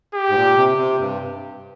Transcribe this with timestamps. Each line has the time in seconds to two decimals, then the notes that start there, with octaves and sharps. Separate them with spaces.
0.14 G4
0.29 G#2
0.35 A#2
0.56 C3
0.77 C3
0.99 G2